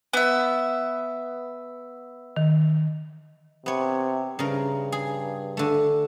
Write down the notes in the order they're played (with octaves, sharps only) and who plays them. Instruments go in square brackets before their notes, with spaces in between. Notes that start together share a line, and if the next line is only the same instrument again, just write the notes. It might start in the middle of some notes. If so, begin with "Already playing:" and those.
[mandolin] B3 E5
[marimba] D#3
[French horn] C3 [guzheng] B3 C#5
[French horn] G2 [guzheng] C#3 A#4
[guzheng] G#4
D3 A3